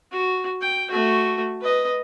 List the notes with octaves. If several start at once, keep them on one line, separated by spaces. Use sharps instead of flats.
F#4
G5
A3 F#4
B4 D#5